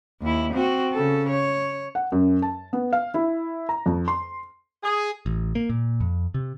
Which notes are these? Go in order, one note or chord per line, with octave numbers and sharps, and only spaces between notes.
D#2 E4
C4 F#4
C#3 A4
C#5
F#5
F#2
A5
B3
F5
E4
A#5
F2
C6
G#4
A1
A#3
A#2
F2
C3